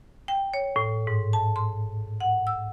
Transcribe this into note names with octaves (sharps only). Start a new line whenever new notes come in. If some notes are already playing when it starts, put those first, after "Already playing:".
G5
C#5
A2
G#2
A5
C6
F#5
E6